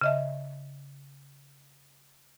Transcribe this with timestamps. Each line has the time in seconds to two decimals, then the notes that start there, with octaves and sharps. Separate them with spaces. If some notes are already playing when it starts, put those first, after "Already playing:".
0.01 C#3 D#5 E5